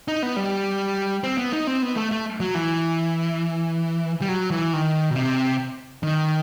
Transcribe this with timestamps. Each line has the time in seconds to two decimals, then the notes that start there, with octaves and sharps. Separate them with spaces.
0.08 D#4
0.23 B3
0.36 G3
1.24 C4
1.38 B3
1.53 D#4
1.67 C4
1.82 B3
1.96 A3
2.11 A3
2.40 F#3
2.55 E3
4.21 G3
4.29 F#3
4.50 E3
4.73 D#3
5.10 B2
5.16 C3
6.03 D#3